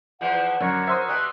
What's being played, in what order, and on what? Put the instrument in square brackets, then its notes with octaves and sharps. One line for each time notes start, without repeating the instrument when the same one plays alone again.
[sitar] E2 E3 F3 [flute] F#5
[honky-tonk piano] F#2 [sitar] D3 [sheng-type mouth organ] F#4 A#4 C#5
[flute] C5 [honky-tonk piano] E5 C6 D#6
[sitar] B2 G3 [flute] F#6